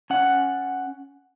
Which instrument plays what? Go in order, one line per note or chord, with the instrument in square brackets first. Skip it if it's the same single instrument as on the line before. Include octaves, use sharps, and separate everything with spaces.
[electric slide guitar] C#4 F#5